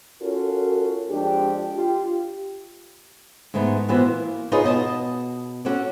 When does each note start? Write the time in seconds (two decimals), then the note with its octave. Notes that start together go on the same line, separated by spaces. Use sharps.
0.21 C#4 F4 F#4 A4 A#4
1.10 F2 G#3 D4 G4
1.75 F4 G4
3.54 G#2 D#3 A3 B3 D#4
3.88 A#2 E3 B3 F#4 C5 E5
4.05 A#3
4.52 D#4 F4 G#4 B4 C#5 D#5
4.64 B2 D#5 G#5 A5
5.65 C#4 F#4 A4 C#5 D5